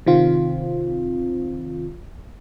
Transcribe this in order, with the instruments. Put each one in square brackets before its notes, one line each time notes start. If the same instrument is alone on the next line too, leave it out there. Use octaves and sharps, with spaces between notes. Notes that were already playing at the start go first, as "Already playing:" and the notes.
[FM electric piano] C3 D#3 C4 F4